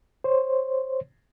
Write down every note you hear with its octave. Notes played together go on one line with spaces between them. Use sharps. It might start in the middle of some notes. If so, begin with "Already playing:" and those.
C5 C#5